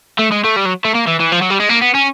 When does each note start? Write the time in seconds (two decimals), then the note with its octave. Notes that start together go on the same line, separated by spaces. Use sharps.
0.19 A3
0.32 G#3
0.45 A3
0.56 G3
0.66 F#3
0.85 A3
0.95 A#3
1.07 E3
1.20 E3
1.32 F3
1.41 F#3
1.50 G3
1.60 G#3
1.69 A#3
1.82 B3
1.94 C#4